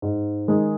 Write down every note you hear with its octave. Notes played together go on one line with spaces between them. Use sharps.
G#2
D#3 G#3 D#4 G#4